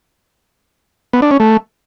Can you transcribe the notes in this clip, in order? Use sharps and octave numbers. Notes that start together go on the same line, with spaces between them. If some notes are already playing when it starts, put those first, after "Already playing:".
B3
D4
C#4
A3